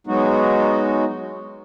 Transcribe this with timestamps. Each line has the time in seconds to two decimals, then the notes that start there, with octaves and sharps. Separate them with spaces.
0.07 F#3 G#3 B3 D#4 F#4